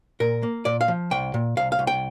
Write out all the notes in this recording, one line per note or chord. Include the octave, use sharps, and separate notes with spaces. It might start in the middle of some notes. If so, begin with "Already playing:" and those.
A#2 A#4
A#3
A#2 D5
F5
F3
C2 G5
A#2
C2 F5
F5
C2
G5